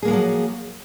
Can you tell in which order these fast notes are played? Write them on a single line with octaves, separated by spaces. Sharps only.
G#4 A#3 G#3 F3 F#3